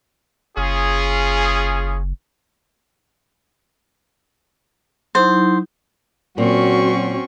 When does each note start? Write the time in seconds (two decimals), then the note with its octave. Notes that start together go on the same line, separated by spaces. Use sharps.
0.57 F#1 C#4 F4 G#4
5.15 F#3 D#4 E4 C5
6.38 A#2 F#3 C4 C#4 F#4 C#6